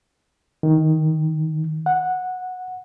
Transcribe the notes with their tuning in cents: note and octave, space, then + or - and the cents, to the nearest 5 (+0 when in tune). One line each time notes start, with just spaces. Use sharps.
D#3 +15
F#5 -10